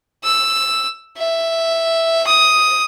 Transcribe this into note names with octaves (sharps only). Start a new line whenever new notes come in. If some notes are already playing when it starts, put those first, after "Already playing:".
E6
E5
D#6